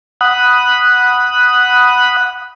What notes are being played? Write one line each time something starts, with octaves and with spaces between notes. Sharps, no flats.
F#5 B5 D#6 F#6